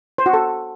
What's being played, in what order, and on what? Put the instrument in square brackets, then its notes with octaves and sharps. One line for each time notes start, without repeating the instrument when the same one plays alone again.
[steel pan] C5
F#4
A4